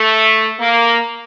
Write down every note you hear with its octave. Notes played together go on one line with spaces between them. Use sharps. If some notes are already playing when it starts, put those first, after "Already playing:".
Already playing: A3
A#3